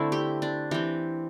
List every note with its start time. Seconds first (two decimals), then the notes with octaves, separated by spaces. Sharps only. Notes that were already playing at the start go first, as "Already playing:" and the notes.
Already playing: D3 A3 C4 E4
0.12 G4
0.42 D4
0.71 E3 C4 G4